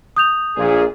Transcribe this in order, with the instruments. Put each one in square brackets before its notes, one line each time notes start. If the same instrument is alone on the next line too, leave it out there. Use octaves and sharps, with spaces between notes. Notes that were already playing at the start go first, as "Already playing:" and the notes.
[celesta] D#6 G6 F7
[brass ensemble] A#1 A#2 G#4